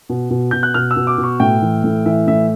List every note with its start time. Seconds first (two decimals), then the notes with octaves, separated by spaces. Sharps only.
0.09 B2
0.30 B2
0.51 B2 G6
0.63 F#6
0.74 B2 F6
0.91 E6
0.96 B2
1.07 D6
1.18 B2
1.23 C#6
1.40 A2 G5
1.62 E3
1.84 A2
2.06 E3 E5
2.27 A2 E5